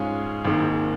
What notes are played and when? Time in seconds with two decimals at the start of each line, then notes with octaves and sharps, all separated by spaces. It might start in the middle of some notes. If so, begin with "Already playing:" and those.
Already playing: G#2 G#3 C#4 F4 G#4
0.45 G#1 G#2 D#3 A#3